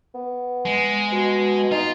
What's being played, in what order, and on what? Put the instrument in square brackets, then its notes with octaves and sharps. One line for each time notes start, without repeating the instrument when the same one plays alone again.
[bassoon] B3
[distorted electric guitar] G#3
[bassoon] B2
[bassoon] D#4 [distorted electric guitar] F4